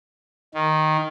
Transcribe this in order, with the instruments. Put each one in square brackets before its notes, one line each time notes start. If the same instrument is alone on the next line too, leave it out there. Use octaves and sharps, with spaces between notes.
[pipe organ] D#3